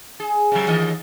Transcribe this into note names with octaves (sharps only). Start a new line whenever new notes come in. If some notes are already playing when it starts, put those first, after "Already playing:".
G#4
C#3 F#3
D#2 E3 D#5